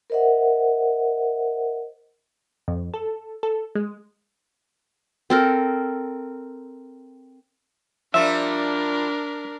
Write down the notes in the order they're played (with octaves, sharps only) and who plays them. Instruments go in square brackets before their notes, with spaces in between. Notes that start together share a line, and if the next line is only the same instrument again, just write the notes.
[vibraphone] A#4 C5 D#5 E5 F#5
[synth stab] F2
A4
A4
G#3
[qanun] C4 A4 A#4
[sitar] F3 G3 F4 [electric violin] D4 A#4 [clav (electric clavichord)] E5